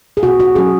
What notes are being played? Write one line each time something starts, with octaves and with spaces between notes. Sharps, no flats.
G#4
B2 F#4
F#4
F#3 C#4 G#4